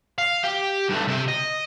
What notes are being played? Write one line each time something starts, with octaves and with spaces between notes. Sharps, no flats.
F5
G4
G2 A3
C3 C4
D#5